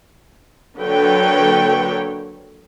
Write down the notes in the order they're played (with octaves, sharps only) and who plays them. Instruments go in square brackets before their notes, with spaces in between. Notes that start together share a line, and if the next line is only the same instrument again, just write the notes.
[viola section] D3 F#3 A#3 B4 C#5 G5